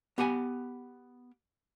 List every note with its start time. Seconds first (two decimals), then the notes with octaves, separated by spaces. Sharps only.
0.18 B3 G4 F#5 G#5